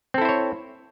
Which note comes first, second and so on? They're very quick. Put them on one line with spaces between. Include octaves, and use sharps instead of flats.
C4 A4 E4 C5 C#5